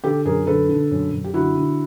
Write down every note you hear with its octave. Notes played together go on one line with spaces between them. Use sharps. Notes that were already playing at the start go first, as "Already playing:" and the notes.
D3 G4 A4
F#2 G#4 A#4
D3 A4 B4
D3
F#2
F#2
G4
D3 E4 F#4
D3